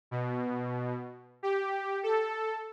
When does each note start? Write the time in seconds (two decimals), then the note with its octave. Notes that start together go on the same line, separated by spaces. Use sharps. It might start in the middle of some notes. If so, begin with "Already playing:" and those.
0.11 B2
1.43 G4
2.03 A4